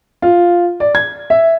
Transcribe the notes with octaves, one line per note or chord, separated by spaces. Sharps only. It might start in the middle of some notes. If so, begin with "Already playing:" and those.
F4
D5
G#6
E5